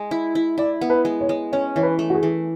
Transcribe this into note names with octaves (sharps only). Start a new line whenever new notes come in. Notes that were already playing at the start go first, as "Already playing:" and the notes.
Already playing: G#3
E4
E4
E4 D5
B3
B4
G#3
C#5
G#3
C#4 C#5
E3 C#5
B4
A3
F#4
G#4
E3